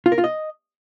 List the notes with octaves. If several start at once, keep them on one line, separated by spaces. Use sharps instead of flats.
F4
A#4
F4
D#5